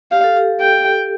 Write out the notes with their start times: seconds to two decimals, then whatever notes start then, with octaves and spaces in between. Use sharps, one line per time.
0.12 G4 F5
0.24 A4
0.37 G4
0.61 G5